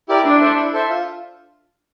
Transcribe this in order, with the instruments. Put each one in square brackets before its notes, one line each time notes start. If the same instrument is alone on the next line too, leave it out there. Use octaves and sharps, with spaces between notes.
[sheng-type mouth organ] E4 G4 A#4 D5
[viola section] D4 [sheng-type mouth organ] E4
[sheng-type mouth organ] A4 C5 E5
E4
A4 C5 E5
F4